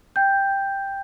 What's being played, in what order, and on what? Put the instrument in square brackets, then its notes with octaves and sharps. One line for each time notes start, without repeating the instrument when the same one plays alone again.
[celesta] G5 G6